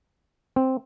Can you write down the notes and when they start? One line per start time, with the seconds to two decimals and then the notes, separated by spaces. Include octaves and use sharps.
0.56 C4